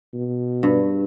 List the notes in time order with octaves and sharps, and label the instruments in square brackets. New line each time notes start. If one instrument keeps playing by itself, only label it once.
[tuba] B2
[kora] G2